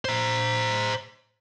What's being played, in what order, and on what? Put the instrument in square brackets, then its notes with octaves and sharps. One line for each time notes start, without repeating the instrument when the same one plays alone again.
[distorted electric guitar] C5 A#5